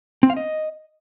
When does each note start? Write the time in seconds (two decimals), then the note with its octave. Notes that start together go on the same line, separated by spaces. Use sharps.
0.23 C4
0.30 F5
0.37 D#5